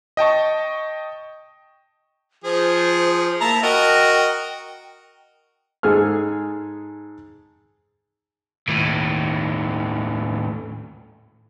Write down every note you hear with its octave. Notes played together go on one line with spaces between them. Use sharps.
D#5 G5 A5 C#6
F3 G#4 C5
A#3 E4 A5 A#5
F#4 A#4 D#5 G5
G#2 G#4 A4 F6
D#2 A2